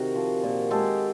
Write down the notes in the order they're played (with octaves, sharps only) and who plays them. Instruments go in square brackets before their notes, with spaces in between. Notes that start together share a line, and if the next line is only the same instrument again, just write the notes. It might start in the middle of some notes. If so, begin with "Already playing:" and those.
Already playing: [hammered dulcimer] C3 D#3 F#4 G#4
F3
A#2
G#3 G4 A4